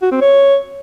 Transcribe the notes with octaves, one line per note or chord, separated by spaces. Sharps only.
F#4
C4
C#5